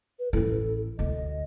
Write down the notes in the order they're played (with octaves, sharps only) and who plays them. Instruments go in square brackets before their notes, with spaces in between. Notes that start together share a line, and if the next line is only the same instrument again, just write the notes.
[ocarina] B4
[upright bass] A1 E4 [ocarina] A4
[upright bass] D2 [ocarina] D#5